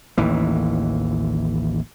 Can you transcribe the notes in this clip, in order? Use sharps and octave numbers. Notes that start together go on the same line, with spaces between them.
A1 D#2 E3